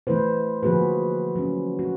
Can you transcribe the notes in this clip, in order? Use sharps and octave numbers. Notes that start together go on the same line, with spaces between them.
E3 A3 E4 B4 C5
D3 F3 A#3 F#4 G#4 B4
F#3 C#4
F#4